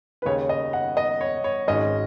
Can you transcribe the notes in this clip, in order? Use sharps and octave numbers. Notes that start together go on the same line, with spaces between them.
B4
D#2 C#3 G#3 C#5
D#5
F#5
D#5
C#5
C#5
G#1 G#2 G#3 C#4 F#4 D#5